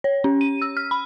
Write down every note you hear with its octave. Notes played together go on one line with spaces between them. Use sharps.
C#5
C#4
D#7
E6
F6
B5